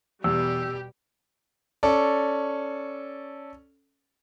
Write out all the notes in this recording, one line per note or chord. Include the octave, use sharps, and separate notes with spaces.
E2 B2 G3 G4 E6
C#4 A4 D5